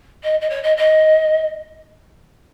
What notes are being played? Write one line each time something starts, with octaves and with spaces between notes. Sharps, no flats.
D#5
D#5
C#5
D#5
D#5